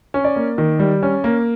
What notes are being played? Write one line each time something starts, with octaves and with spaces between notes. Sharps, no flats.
C#4
D5
A#3
D#3
G3
C#4
A#3